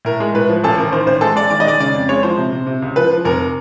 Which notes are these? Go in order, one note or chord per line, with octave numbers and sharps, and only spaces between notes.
A2 A#4
G#3
A2 B4
F3
A1 A4
A1 A#4
D#3 C5
A1 C5
G#3 A4
G#3 D5
D#3 D5
D#5
G#3 D5
C#3 D5
F2
G#3 C#5
F3 C5
C3
C3
C3
C#2
F3 B4
F3
F1 A#4